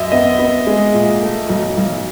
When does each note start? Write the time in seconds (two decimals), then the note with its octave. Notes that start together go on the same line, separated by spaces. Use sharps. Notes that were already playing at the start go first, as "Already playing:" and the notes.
Already playing: F#2 D#5 E5
0.12 B3 D#5
0.39 B3
0.67 G#3
0.94 A#2
1.23 A3
1.49 B1
1.77 B1